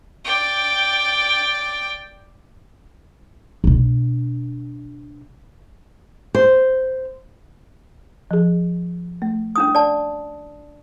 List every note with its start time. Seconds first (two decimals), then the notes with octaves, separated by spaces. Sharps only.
0.25 D5 G5
3.64 B2 D4
6.35 C5
8.31 F3 G#4
9.22 A3
9.56 C#4 D4 D#6
9.75 D5 A5